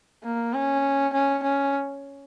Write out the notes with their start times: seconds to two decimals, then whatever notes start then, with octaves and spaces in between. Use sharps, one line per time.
0.23 A#3
0.53 C#4
1.13 C#4
1.43 C#4